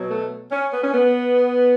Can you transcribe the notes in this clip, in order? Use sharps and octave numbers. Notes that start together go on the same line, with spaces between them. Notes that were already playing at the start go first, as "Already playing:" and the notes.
Already playing: B2 F#3
A3
C#4
B3
C#4
B3